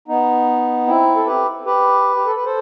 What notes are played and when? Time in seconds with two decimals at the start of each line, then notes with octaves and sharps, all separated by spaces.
0.08 B3 D#4
0.87 C4 E4
1.15 A4
1.26 G4 B4
1.65 G4 B4
2.16 G4
2.26 A4
2.36 B4
2.45 A4 C5